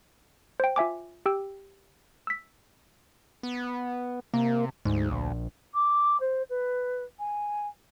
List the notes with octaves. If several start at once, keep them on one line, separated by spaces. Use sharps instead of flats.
C5 G5
F4 E5 G#5 D6
G4 G5 E6
E6 B6
B3
C3 A#3
D2 G#2
A#1
D6
C5
B4
G#5